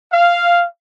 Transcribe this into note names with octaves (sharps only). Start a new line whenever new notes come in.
F5